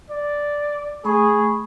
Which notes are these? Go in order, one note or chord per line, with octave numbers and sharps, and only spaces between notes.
D5
A3 G#4 B5 C#6